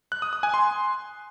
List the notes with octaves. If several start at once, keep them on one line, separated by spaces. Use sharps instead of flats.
F#6
D#6
D#6
G#5
C6